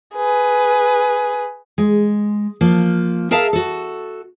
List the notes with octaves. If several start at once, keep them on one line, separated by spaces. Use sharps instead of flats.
G#4 B4
G#3
F3 A#3
G#4 A#4 E5 F5 A5
F#4 A4